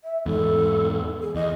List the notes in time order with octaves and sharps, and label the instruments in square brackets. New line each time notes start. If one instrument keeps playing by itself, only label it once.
[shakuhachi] E5
[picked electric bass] E2 G#2 [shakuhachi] A4
[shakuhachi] G#4
[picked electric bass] E2 [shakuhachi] D#5